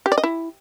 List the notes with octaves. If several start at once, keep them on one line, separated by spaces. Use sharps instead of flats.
G4
D5
D#5
E4